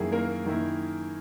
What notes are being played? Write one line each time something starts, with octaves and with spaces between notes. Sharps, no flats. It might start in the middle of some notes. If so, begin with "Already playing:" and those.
Already playing: F#2 D#3 A#3 E4 G#4
A#3 A#4
F#2 D#3 A#3 E4